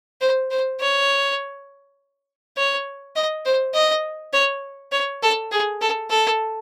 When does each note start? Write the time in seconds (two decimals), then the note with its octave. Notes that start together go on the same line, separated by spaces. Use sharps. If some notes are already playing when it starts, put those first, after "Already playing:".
0.21 C5
0.51 C5
0.80 C#5
2.57 C#5
3.16 D#5
3.46 C5
3.74 D#5
4.33 C#5
4.92 C#5
5.23 A4
5.52 G#4
5.81 A4
6.10 A4